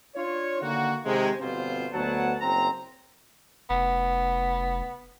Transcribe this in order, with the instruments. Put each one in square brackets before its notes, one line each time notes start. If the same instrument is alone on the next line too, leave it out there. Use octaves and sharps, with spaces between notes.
[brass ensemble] D4 F4 C#5
D3 D#3 A#3 F#4
C3 D#3 G#3
G1 B2 C4 F4 C5
D2 F#3 B3 F#5 A5
F#1 C4 A#5
[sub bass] F1 [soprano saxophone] B3